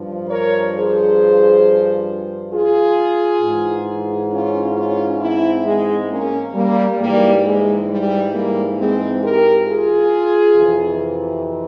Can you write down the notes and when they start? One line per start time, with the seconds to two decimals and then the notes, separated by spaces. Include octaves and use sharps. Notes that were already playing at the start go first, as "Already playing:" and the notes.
Already playing: G2 F3
0.28 A#4 C#5
0.74 G#4 C5
2.52 F4 G#4
3.42 G#2 E3
4.31 C#4 F4
4.75 C#4 F4
5.20 C4 E4
5.65 G#3 C4
6.09 A#3 C#4
6.54 G3 A#3
6.98 G#2 E3 G3 A#3
7.43 G#3
7.89 G3
8.33 G3 A#3
8.77 G#3 C4
9.22 G4 A#4
9.66 F4 G#4
10.56 F2 C3 E3